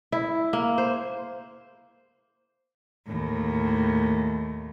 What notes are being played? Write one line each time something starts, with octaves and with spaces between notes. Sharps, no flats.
E4
A#3
C5
D#2 A2